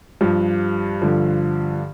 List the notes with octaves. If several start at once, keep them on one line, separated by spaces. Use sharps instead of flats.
G2 F3
G2 D3 F3